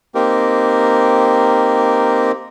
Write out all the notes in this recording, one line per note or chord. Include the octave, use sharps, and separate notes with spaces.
A#3 C4 D#4 G4 A#4